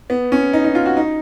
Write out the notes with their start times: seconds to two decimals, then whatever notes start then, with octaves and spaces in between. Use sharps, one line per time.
0.10 B3
0.32 C#4
0.53 D#4
0.65 D#4
0.75 F4
0.86 F#4
0.97 D#4